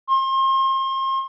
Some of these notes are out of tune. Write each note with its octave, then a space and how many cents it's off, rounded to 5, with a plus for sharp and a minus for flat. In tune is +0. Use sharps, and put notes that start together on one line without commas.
C6 +35